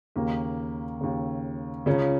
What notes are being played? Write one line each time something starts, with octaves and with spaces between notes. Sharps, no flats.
D#2 C#3 A#3
D#2 C#3
C#2 C#3 C#4